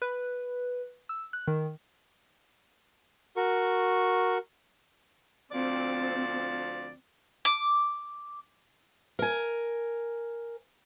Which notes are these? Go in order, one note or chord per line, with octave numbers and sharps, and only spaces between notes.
B4
E6
F#6
D#3
F#4 A#4 C#6
D2 F3 C4 D5
D6
A#4 G#5